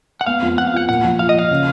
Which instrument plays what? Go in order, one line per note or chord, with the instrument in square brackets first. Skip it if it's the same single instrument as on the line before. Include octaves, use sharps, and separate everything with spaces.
[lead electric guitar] F#5
[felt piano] B3 [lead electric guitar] F5
[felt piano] F2
[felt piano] F2 [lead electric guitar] F#5
[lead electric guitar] F5
[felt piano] F4 [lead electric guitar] F#5
[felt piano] A#2 [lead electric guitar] F#5
[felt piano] F3
[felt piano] F3 [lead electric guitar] F5
[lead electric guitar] D#5
[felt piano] F3 [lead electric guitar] F5
[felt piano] C#3